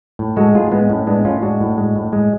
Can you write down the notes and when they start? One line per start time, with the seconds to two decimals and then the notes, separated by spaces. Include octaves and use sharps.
0.19 A2
0.36 G#3 F#4 A4
0.54 A2 F4 G#4
0.71 G#3 B3
0.90 A2 C#4
1.07 G#3 B3 D4
1.25 A2 C#4 F4
1.42 G#3 D4 F#4
1.60 A2
1.78 G#3
1.96 A2
2.13 G#3